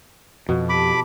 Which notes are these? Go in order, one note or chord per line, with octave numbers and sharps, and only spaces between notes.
F2 B2
G4 A5 B5 D6